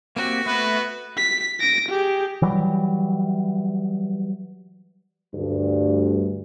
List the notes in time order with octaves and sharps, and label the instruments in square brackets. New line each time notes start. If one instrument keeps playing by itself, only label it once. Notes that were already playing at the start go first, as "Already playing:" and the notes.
[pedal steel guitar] A#3 C4 G4 [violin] F#4
[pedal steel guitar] A3 E5 F#6 [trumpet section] B3 B4
[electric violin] B6
A#6 D7
G4 G#4
[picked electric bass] E3 F#3 G3
[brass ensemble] D2 G2